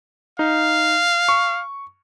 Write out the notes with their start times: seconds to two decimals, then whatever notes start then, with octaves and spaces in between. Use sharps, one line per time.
0.39 D#4 F5
1.29 C#6